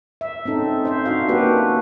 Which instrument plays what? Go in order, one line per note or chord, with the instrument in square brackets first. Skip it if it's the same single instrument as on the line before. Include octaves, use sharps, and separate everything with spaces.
[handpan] E5
C4 C#4 D#4 A4
C5 E5
D4 D#4 F#4 F5
A#3 C#4 D4 F#4 G4 B4